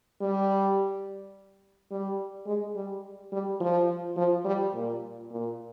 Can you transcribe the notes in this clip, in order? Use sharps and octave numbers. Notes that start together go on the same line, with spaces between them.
G3
G3
G#3
G3
G3
F3
F3
G3
A#2
A#2